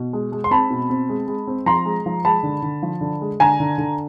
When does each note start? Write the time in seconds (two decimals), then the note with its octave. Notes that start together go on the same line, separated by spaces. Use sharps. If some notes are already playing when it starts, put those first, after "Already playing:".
Already playing: B2
0.13 G#3
0.32 G#3
0.44 C6
0.51 C4 A5 B5
0.70 B2
0.90 C4
1.09 G#3
1.28 G#3
1.47 C4
1.66 F3 A#5 C6
1.86 G#3
2.06 F3
2.25 G#3 A5 B5
2.43 D3
2.62 D3
2.83 F3
3.01 D3
3.21 G#3
3.40 D3 G#5 A#5
3.60 D3
3.78 D3